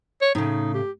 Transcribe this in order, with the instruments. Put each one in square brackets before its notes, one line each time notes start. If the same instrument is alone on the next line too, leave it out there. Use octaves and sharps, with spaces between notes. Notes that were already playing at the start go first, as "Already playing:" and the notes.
[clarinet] C#5
[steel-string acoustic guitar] A2 C#3 [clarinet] D#4
[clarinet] G4